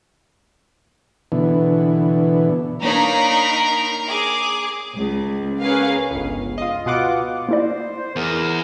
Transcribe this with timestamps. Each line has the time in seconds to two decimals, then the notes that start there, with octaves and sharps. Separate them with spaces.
1.32 B2 D3 E3
2.83 A#3 D4 D#4 A#4 C#5 B5 C7
4.07 G#4 D6
4.96 C#2
5.60 C#4 G#4 A#4 B4 F5
6.11 G1 C#2
6.58 F4 D#5
6.86 B2 F4 F#5 D6
7.49 A#3 E4 C5 D5
8.16 E2 A#4